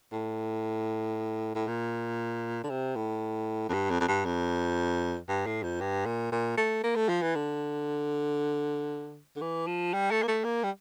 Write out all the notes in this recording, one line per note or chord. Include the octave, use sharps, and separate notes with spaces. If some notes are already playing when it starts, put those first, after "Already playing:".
A2
A2
A#2
D3
C3
A2
F2
G2
F2
F2
G2
F2
G2
A2
F2
G2
A#2
A#2
A3
A#3
A3
F3
E3
D3
D3
E3
F3
G3
A3
A#3
A3
A#3
G3